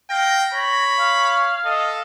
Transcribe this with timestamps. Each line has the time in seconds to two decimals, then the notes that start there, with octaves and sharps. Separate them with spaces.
0.10 F5 G5 A#6
0.54 C#5 B5
0.97 F5
1.65 A4 D#5